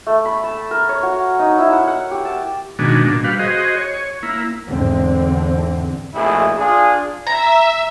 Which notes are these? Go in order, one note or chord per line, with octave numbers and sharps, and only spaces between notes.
A3
B5
A5
A#4
C#5
F#4
D#4
E4
F#5
F#5
G4
A5
B2 D#3 G#3 D4 F#4
A#2 D4
G3 F#4 B4 F5
F#4 G#4 C5 D#5
C#5
A#3 E4
E2 G#2 D3 C4
A#1 B2 A3 E4 G#4
D4 F4 G#4
E5 A#5